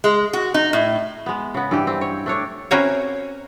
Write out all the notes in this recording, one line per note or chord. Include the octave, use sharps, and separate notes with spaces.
G#3
F#4
D#4
A2
G#3 B3
C#3 B3
G2 E3 G4
C4
C#5
A3 D4 C#5
C4 C#4 E4 F#4 A#4 C#5